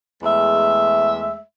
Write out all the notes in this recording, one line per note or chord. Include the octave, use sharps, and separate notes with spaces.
E2 G#3 A3 E5